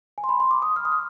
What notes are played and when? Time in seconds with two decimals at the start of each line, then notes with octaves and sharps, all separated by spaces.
0.18 G#5
0.24 C6
0.29 B5
0.40 C6
0.51 D6
0.62 D#6
0.76 F6
0.85 D#6
0.92 F6